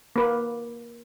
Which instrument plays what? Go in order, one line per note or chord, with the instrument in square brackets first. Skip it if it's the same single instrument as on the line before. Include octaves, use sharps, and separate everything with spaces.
[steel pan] A#3 B4